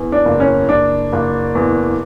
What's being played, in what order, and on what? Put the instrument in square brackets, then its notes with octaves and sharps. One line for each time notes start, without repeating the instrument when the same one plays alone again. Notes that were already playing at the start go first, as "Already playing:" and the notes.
Already playing: [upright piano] E2
D4
F#1
C#4
F#1 D4
F#1
E2